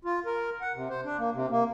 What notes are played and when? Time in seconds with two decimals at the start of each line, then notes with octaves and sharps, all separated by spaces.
0.05 F4
0.25 A#4
0.61 F#5
0.74 C3
0.89 C5
1.05 D4
1.19 A#3
1.33 C3
1.50 A#3